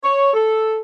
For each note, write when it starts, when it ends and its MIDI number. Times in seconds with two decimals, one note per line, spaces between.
0.03 0.32 73
0.34 0.78 69